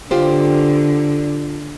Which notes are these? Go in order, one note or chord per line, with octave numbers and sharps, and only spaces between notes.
D3 F4 G4 C5